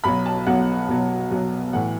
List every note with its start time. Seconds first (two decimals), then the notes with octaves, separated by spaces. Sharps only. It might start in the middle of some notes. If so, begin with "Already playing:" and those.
0.04 B1 B2 F#3 B5
0.26 A5
0.46 B1 B2 F#3 F#5
0.88 B1 B2 F#3
1.31 B1 B2 F#3
1.73 A2 E3 F#5